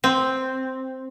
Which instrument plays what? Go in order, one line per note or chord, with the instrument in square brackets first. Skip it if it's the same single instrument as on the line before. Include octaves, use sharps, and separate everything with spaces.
[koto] C4